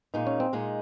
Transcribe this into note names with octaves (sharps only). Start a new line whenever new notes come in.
A#2 G#3 D#4
C#4
C4
A#2 G#3 D#4